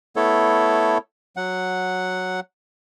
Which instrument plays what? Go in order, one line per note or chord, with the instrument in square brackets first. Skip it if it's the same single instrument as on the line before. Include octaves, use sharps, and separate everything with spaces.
[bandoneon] A3 B3 E4 A4 C#5
F#3 F#5